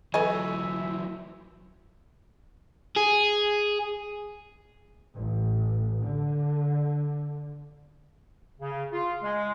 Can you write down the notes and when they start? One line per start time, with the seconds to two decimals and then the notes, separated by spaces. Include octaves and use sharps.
0.14 E3 F#3 A4 B4 D#5 E5 G#5
2.97 G#4
5.18 A1
6.03 D3
8.61 C#3
8.92 F4
9.23 G#3